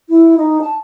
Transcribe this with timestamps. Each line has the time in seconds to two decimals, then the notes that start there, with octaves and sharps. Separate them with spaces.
0.10 E4
0.37 D#4
0.61 A5